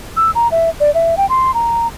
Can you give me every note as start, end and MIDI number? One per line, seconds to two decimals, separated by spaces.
0.17 0.31 88
0.35 0.50 82
0.51 0.70 76
0.80 0.93 74
0.94 1.15 76
1.17 1.28 79
1.29 1.54 84
1.54 1.87 82